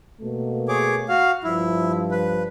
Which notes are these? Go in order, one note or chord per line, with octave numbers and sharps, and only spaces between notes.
B2 A3 A#3
G#4 C#5 D6
F#4 F5
G2 F3 E4
B4